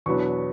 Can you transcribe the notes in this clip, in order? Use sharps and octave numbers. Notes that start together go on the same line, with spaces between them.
E2 B2 F#3 B3 D4 C#6